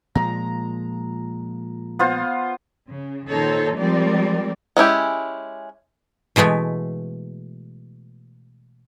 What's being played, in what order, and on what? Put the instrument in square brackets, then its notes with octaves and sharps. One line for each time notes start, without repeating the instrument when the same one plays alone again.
[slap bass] A#2 F3 G#3 [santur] A#5
[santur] B3 F4 C5
[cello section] C#3
A#2 D#3 D#4 A4 C5 C#5
F3 G3 G#3 C4 A#4 D5
[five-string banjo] G#3 C#4 E4 G4
[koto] B2 E3 G#3 A3 B3